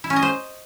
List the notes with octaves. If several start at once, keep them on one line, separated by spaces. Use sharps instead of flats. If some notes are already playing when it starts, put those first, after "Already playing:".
E4
C#4
D#5
C5